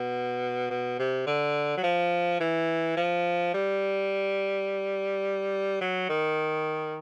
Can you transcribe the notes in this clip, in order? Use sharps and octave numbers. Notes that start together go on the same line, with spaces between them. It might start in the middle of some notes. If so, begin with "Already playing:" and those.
Already playing: B2
B2
C3
D3
F#3
F3
E3
F3
G3
F#3
D#3